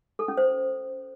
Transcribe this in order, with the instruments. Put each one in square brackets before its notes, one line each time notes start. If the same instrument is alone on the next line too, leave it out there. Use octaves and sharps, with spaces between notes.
[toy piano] A4
C#4
C5